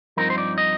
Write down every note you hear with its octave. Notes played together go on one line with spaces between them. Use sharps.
G2 F3 C4 D#4 A#4
C5
D5
D#5